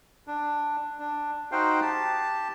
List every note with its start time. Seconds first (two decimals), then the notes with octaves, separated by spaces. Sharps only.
0.27 D4
0.99 D4
1.52 D#4 F#4 C5 F5 G5
1.81 G4 A5